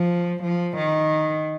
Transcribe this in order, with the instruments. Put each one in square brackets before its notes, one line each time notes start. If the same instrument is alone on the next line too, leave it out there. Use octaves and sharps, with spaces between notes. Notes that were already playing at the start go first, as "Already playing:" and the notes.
Already playing: [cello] F3
F3
D#3